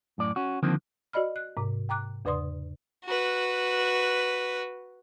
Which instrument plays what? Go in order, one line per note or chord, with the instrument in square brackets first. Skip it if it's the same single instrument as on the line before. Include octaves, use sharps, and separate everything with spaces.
[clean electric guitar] F#2 A2 D5
C#4 F#4
D3 D#3 F3 A#3 C4
[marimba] F#4 D5 D#5 B5 F6
F#6
G#2 C3
G5 A#5 D6 F#6
E2 C#3 B4 D5 C6 D#6
[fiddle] F#4 B4